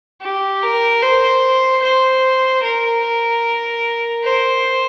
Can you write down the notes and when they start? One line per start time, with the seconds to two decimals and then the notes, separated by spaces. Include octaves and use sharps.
0.22 G4
0.63 A#4
1.02 C5
1.82 C5
2.63 A#4
4.24 C5